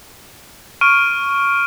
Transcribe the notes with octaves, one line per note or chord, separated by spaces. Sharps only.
C#6 F6 D7 D#7